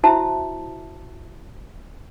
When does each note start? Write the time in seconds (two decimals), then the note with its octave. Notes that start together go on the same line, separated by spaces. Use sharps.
0.04 E4 F#4 C5 E5 A5